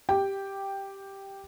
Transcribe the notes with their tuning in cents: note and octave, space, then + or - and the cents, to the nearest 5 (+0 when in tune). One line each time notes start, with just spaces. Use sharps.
G4 +0 G5 +0